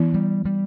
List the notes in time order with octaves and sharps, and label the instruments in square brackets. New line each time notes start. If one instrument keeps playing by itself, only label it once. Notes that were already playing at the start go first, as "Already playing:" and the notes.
Already playing: [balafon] E3 B3 E4
[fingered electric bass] G3
G3